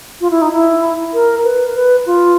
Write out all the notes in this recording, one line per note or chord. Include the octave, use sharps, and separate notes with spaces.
F4
E4
D#4
E4
A#4
B4
B4
F4